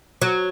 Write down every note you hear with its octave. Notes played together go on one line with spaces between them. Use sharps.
F#3